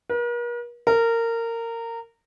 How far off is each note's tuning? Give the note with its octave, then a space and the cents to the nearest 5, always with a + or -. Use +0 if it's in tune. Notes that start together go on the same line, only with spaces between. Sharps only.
A#4 +45
A#4 -20